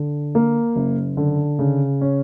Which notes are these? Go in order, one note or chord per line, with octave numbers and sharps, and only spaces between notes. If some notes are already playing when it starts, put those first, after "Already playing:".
Already playing: D3
A#3
F#1
D3
C#3
C#4